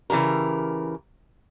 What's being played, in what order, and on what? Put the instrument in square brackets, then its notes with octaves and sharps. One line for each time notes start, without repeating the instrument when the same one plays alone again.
[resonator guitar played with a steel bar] C#3 E3 F#3 G4 A#4